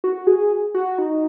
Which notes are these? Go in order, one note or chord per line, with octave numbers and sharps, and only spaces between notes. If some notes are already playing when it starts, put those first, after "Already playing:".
F#4
G#4
F#4
D#4